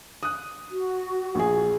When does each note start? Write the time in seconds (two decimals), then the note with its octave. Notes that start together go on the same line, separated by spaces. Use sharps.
0.23 D#6 F#6
0.71 F#4
1.35 A#1 G#4